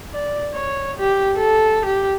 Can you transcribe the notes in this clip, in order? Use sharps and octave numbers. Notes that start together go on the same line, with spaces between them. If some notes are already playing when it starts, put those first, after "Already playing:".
D5
C#5
G4
A4
G4